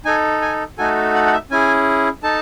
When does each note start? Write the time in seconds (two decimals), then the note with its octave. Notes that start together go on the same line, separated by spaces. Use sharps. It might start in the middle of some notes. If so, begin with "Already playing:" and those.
0.05 D#4 A4 G#5
0.42 G#5
0.78 A3 D#4 F#4 A4 G#5
1.15 F#5
1.26 F#5
1.33 E5
1.51 C#4 E4 G#4 G#5
2.23 D#4 A4 A5